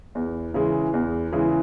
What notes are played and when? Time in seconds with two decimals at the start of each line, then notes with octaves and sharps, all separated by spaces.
0.15 E2
0.54 C#3 E3 G#3
0.94 E2
1.32 C#3 E3 G#3